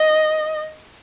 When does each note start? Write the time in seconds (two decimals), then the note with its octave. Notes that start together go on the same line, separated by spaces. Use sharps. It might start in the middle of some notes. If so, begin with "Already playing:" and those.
Already playing: D#5